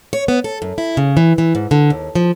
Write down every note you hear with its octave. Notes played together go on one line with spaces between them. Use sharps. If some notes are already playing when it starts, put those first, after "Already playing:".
C#5
B3
A4
F#2
E4
C#3
E3
E3
G#2
D3
D#2
F3